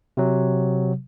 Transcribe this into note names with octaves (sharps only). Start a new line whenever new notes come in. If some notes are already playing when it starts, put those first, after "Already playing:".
C3 F#3